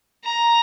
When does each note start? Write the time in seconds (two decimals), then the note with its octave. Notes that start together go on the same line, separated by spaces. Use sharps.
0.25 A#5